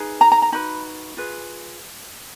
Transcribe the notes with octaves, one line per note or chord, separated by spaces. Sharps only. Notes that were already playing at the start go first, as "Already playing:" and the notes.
Already playing: D#4 G#4 B4
A#5
A#5
A#5
D#4 F#4 B4 B5
F4 G#4 B4